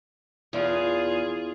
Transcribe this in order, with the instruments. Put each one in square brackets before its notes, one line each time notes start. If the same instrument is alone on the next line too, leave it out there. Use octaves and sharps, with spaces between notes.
[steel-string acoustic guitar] E2 [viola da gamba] F4 G#4